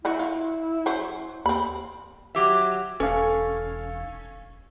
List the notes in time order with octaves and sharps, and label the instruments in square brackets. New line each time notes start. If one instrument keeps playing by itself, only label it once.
[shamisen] D#3 F#3 F#4 [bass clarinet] E4
[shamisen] F4
F#3 C#4 C5
[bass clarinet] D#2 [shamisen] C4 B5
[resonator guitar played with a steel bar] F#3 G4 E5
[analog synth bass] E1 [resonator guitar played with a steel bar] C#4 [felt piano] A4 F5